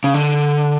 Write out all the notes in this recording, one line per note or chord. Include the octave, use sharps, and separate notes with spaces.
C#3
D3